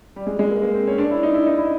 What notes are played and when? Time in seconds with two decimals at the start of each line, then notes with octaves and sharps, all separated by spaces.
0.16 G3
0.27 G#3
0.39 G#3
0.50 A#3
0.62 A#3
0.74 C4
0.87 C#4
0.98 D4
1.11 E4
1.23 D#4
1.34 E4
1.47 D#4
1.58 E4